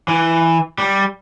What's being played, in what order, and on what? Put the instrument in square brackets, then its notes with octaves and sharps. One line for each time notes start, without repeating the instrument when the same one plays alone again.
[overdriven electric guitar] E3
G3